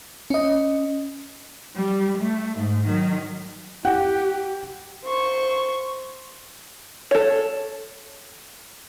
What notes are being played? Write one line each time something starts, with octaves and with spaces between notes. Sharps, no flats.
C#4 D#5
G3
A3
G#2
D#3 F#3
G4 F#5 G5
C5 C#6
A4 C#5